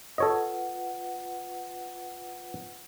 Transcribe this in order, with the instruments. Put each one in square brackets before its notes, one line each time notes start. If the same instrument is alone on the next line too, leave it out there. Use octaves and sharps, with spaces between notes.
[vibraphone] F4 B4 F#5 [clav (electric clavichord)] A4 C#5 D#5